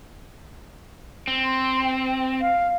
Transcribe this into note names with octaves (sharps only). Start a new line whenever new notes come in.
C4
C6
G5
F5